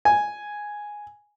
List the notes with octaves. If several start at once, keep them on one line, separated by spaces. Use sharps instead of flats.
G#5